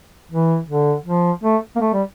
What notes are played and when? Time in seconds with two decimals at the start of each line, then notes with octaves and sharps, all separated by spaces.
0.32 E3
0.68 D3
1.05 F3
1.44 A3
1.76 A#3
1.81 A3
1.93 G3